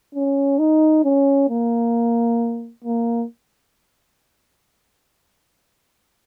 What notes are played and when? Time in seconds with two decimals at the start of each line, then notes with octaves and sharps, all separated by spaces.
0.15 C#4
0.59 D#4
1.04 C#4
1.50 A#3
2.85 A#3